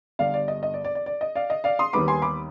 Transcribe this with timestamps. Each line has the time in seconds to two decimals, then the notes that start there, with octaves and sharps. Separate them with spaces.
0.19 G1 G2 D3 D5 F5
0.34 D5
0.48 D#5
0.63 D#5
0.74 D5
0.85 D5
0.95 D5
1.06 D5
1.21 D#5
1.35 D5 F5
1.50 D#5
1.64 D5 F5
1.79 C6 D#6
1.93 D#2 D#3 G3 B3 D#4 B5 D6
2.08 G#5 C6
2.22 B5 D6